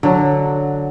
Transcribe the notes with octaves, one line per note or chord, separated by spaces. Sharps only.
D3 F#3 F#4